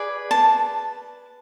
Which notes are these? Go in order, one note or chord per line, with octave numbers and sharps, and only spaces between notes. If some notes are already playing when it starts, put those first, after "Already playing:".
Already playing: G#4 B4 D5
A5